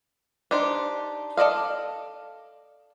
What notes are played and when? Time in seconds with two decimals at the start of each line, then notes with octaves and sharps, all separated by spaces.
0.51 D4 D#4 G4 C5
1.37 A4 D5 D#5 F5